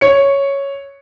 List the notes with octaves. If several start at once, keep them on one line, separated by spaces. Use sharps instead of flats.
C#5 C#7